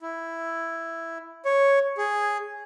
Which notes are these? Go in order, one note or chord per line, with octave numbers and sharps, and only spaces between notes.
E4
C#5
G#4